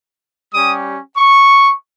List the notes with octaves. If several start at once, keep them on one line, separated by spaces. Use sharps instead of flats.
G3 C#4 G4 D#6
C#6